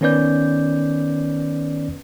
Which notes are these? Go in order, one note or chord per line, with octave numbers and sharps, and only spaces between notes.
D#3 B3 C#4 B4 D5 G6